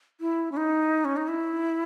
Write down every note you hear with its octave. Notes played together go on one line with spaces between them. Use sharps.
E4
C#4
D#4
C#4
D#4
E4